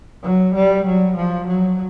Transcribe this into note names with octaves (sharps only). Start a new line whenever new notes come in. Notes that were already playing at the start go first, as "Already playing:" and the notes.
F#3
G3
F#3
F3
F#3